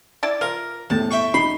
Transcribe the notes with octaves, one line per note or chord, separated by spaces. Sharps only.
E4 D5 A5
F4 A#4
E2 A2 C3 A5
E5 G5 C#6
D#4 B5 C6